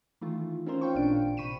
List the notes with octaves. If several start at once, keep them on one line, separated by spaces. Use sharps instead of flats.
D#3 E3 A3 F4
C4 C#4 F4 A#4 C5
F5 G5 C#6
A1 A#2 D4 D7
A1
C3 B5 C#6 B6 D#7 E7